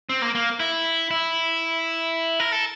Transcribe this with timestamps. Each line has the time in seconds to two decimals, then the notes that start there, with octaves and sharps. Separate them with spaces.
0.09 C4
0.22 A#3
0.35 A#3
0.60 E4
1.11 E4
2.40 A#4
2.52 A4